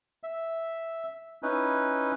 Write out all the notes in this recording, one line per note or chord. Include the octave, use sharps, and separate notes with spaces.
E5
C#4 D#4 E4 B4